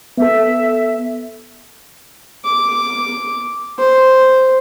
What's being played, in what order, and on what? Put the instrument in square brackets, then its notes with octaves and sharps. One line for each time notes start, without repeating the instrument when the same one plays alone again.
[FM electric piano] B3 A4 [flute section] E5
[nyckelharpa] D6
C5